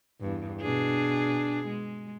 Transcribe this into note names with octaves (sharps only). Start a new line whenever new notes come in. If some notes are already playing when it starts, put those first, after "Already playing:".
E2 G2
B2 D4 G#4
G#3